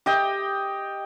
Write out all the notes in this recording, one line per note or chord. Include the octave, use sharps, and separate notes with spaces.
G4 D#5 G5